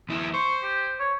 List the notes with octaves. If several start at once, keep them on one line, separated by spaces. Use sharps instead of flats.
D#2 E4
C5 C#6
G4
C#5